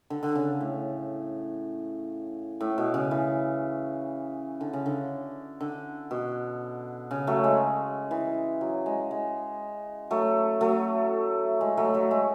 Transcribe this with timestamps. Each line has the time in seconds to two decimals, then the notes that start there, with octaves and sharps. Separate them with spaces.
0.10 D3
0.23 D3
0.35 C#3
0.61 A2
2.61 A2
2.78 B2
2.94 C#3
3.11 E3
4.61 D3
4.73 C#3
4.86 D3
5.61 D3
6.11 B2
7.11 C#3
7.27 F#3 A3
7.44 G#3
8.11 E3
8.61 F#3
8.86 G#3
9.11 G#3
10.10 F#3 A3
10.61 F#3 A3
11.61 G#3
11.77 F#3 A3
11.94 F#3 A3
12.11 G#3